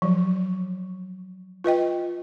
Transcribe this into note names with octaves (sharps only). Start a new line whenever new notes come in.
F3 F#3
F4 B4 D#5 G5